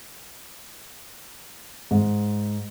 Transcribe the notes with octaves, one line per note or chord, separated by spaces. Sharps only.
G#2